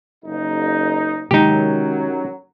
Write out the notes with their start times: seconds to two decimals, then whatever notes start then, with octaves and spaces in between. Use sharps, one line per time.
0.24 F#1 D#4
1.31 F#2 C3 D#3 F#3 G#3 D#4 G4